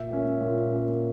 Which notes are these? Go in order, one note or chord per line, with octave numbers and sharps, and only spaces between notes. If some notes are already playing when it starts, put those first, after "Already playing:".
Already playing: A#2 E5
A#3 C#4
A#2
A#3 C#4